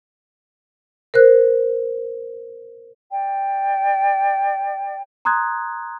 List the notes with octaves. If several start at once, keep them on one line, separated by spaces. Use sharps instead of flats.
A#4 C5 F#6
D5 G5
A#5 C6 D#6 F#6 G#6